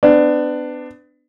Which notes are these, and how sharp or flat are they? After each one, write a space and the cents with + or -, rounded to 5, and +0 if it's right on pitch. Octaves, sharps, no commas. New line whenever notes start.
B3 +35 D4 +15